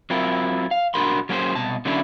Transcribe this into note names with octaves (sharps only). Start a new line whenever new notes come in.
F#3 C4 E4 F4 A#4
F5
B1 D4 F#4 A#4 B5 C6
F#3 A#3 C#4 E4 G#4 C5
C2 B2 A5
D3 F#3 A#3 C#4 D4 E4